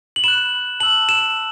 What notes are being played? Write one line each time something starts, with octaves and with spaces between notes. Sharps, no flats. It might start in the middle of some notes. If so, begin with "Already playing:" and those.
F#7
B5 F#6 E7
A5 E6 F#7
E7